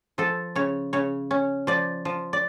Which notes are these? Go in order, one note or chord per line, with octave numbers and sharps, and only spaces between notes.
F3 A4
C#3 C#5
C#3 C#5
C#4
F3 D5
F3
D5